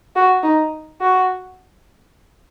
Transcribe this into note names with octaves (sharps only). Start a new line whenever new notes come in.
F#4
D#4
F#4